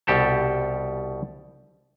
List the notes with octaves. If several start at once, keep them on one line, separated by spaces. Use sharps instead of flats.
C2 B2 G4 A4 A5